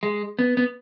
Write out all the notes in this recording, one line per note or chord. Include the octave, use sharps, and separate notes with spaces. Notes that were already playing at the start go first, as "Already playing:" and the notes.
G#3
B3
B3